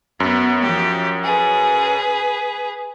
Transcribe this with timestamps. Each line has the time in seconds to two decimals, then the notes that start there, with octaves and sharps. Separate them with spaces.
0.20 F#2 B3
0.61 F3 G4
1.24 G#4 B4